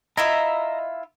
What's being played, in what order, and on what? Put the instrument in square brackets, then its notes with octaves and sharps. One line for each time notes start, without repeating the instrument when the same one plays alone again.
[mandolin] E4 F4 E5 [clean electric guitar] D#5 [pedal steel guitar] A#5